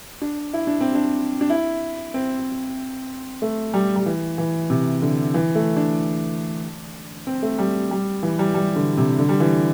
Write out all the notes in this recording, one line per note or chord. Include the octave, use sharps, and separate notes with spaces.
D4
E4
D4
C4
D4
D4
E4
C4
A3
G3
G3
E3
E3
C3
D3
E3
A3
D4
C4
A3
G3
G3
E3
G3
G3
D3
C3
D3
G3
E3